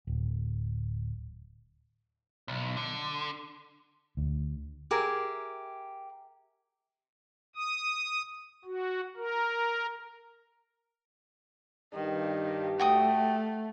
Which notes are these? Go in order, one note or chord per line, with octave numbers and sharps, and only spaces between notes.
D1
B1
D3
D2
G4 G#4 A#4 E5
D#6
F#4
A#4
G2 D#3 G4
A3 F#4 G5 D#6